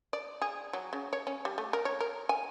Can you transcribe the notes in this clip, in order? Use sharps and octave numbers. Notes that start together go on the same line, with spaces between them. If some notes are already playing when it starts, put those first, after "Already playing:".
D5
G#4
F#3
C#3
C#5
C#4
G3
A3
A#4
C#5
A#4
G#5